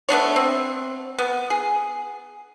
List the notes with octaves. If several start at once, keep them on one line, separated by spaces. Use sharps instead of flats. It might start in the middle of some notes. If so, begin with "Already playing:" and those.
A3 B3 D4 C#5
C4
B3
G#4